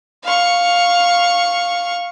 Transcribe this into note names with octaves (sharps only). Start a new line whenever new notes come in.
F5 C#6